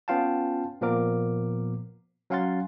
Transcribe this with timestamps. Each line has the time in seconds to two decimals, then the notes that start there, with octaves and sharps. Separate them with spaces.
0.08 B3 C#4 F4 F5 G5 A5
0.81 A#2 F3 A#3 B3 A#4 D6
2.30 F#3 C#4 F5 F#5 C6 A6